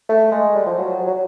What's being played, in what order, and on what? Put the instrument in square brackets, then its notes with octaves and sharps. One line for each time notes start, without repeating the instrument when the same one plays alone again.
[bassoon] A3
G#3
G3
F3
F#3
F#3